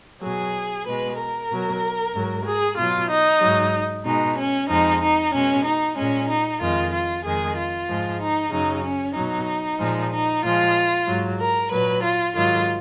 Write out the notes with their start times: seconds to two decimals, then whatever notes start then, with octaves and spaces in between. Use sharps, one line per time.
0.23 B2 F#3 G#4
0.87 B2 G#3 B4
1.19 A#4
1.51 B2 F#3
2.15 G#2 F#3
2.47 G#4
2.78 B2 F#3 F4
3.10 D#4
3.42 G#2 F#3
4.06 B2 G#3 D#4
4.39 C#4
4.69 F2 F3 G#3 D#4
5.02 D#4
5.34 B2 G#3 C#4
5.65 D#4
5.97 A#2 G#3 C#4
6.29 D#4
6.61 F2 D#3 G#3 F4
6.93 F4
7.25 F2 D#3 G#3 G#4
7.57 F4
7.89 G#2 F3 G#3
8.21 D#4
8.53 F#2 C#3 F#3 D#4
8.84 C#4
9.16 B2 F#3 D#4
9.80 A#2 F3 G#3
10.12 D#4
10.44 A#2 F3 G#3 F4
11.08 G#2 F#3
11.40 A#4
11.71 A#2 F#3 B4
12.04 F4
12.36 G#2 D#3 F#3 F4